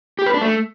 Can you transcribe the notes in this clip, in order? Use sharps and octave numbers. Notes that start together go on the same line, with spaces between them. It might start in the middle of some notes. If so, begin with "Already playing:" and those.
G4
B4
D4
A3